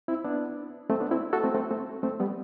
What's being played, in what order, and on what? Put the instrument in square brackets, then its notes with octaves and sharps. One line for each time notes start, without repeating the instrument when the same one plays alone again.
[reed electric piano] C4 E4
B3 D4
A3 C4
B3 D4
C4 E4
F#4 A4
A3 C4
A3 C4
A3 C4
A3 C4
G3 B3